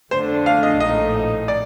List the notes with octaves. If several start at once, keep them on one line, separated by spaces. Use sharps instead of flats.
F2 D3 A3 D4 C5
F5
D#5
A#1 A2 A3 D#4 D#5
D5